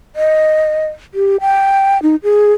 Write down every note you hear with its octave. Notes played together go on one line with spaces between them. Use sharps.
D#5
G4
G5
D#4
G#4